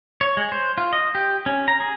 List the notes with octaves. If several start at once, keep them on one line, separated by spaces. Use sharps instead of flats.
C#5
G#3
C5
F4
D#5
G4
C#4
A#5
G#4